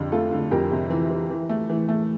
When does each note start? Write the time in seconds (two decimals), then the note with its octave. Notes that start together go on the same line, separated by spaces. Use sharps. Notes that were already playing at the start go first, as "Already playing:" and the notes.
Already playing: F2 D3 G4
0.12 A3 F4 A4
0.32 D3
0.51 F2 G4 A#4
0.72 C3
0.90 E3
1.10 E3
1.30 E3
1.49 A3
1.70 E3
1.88 A3